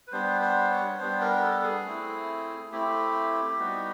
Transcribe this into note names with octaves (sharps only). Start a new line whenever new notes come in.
B4
G3 B3 D4 C5
C5
C#5
G3 B3 D4 C5
A#4
A#4
A4
G#4
A3 C4 E4
A3 C4 E4 G4
G3 B3 D#4 F#4